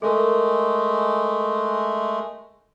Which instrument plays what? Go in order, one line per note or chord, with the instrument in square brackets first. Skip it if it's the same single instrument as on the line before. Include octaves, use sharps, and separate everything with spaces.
[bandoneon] G#3 A3 [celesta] A4 A#4